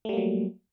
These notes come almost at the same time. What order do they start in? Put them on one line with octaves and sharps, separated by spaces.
A3 G3 A#3 F#3